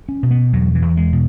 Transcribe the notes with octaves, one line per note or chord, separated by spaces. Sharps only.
C#4
B2
B3
E2 F#3
E3
E2
G#3
B2